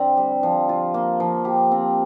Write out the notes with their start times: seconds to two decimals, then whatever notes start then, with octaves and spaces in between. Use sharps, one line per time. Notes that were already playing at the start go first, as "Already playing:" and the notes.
Already playing: D3 C4 D4
0.17 G3
0.43 F3
0.69 F4
0.94 A#3
1.20 F3
1.45 G4
1.72 C4